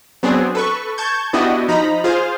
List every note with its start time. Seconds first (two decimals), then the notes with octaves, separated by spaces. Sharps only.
0.23 F#3 B3 C4 D4 G#4
0.55 A4 B4 C#6
0.98 A5 C#6 G6 G#6
1.33 B3 D4 E4 F#4 G4 D#5
1.68 F3 D#4 A#5 B5
2.04 F4 G#4 C5 F5